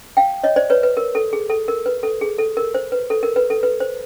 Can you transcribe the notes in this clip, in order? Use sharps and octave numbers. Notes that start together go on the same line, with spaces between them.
F5 G5
C#5 D#5
C5 D5
B4 C#5
B4
A#4
A4
G#4
A4
A#4
B4
A4
G#4
A4
A#4
C5
B4
A4
A#4
B4
A4
B4
C5